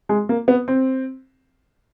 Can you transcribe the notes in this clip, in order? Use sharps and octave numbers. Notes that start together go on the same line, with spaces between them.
G#3
A#3
B3
C4